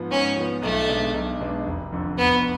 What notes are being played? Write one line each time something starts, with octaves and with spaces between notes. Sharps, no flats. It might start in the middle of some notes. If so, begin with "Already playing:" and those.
Already playing: G#2 F3 B3
G#2 C#4
F3 B3
B1 A3
B2 G#3 D4
B1
B2 G#3 D4
F1
F2 D3
F1 B3